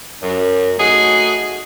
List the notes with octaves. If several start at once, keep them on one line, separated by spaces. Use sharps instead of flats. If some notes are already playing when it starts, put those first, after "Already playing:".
F#2
A3 D#4 F#4 G#4